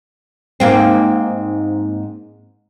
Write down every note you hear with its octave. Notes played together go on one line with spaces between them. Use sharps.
G#2 A#3 C4